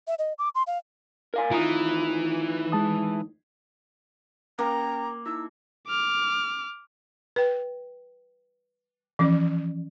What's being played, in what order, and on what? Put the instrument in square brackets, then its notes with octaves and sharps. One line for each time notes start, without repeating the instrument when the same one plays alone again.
[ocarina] E5
D#5
D6
C6
F5
[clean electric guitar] A#4 F5 G#5
[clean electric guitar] A2 D#3 [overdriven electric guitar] E3 [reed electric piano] F4 A#5 D#6
[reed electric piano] G#3 A5 D#6
[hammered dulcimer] A#3 [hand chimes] C#4 G5 [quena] A#5
[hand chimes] D#4 E4 [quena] E6
[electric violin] D6 F6
[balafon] B4 G5
E3 F3 C#4